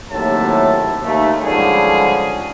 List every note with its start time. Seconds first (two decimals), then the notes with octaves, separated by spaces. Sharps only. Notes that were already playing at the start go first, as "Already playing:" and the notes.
0.11 D#2 A2 C3 F#3 E5 A5
1.03 D#2 A3
1.43 G#2 D3 F3 G3 C#4 G#4